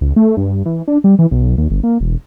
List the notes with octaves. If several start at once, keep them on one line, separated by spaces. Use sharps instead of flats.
C#2
A3
G2
E3
D4
G3
E3
B1
D#2
G1
A#3
E1